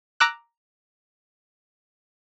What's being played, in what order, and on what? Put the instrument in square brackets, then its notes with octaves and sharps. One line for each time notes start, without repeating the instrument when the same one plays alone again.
[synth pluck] A#5 D6 E6 F#6